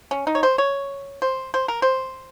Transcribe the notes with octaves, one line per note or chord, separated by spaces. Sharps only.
C#4
D#4
C#5
C5
C#5
C5
C5
A#4
C5